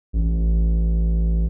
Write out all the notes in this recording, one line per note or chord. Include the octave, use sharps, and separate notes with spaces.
A1